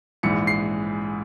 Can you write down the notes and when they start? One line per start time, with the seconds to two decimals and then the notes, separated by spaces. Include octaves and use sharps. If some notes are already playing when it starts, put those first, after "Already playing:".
0.23 A#1 G#2 E3 C#7
0.47 C7